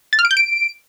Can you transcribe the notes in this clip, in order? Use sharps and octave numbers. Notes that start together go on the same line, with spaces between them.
A6
F6
D7
G6
D7